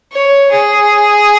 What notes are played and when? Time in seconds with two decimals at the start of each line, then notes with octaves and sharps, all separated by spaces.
0.12 C#5
0.51 G#4